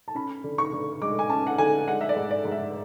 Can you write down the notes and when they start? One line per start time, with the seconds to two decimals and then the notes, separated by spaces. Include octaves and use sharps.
0.08 A5
0.15 C#4 B5
0.44 D3
0.58 C#6
0.73 D3
1.02 G#3 D6
1.19 G#5
1.30 C#4 A5
1.47 F#5
1.58 D3 G#5
1.87 G#3 F#5
2.01 E5
2.09 D5
2.16 G#2
2.31 D5
2.45 G#2
2.51 E5